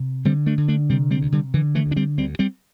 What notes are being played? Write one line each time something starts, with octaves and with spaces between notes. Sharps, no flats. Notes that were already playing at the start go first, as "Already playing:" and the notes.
Already playing: C3
D3 G3 C4
A3 D4
D3
A3 D4
C3 G3 C4
G3 C4
D2
D3 G3
D3 E3
E3 A3
D2
D4
G3 C4
D2 G3 C4
G3 C4